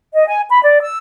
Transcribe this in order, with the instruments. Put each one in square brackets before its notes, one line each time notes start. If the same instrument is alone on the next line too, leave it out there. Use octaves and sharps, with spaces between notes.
[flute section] D#5
G#5
B5
D5
E6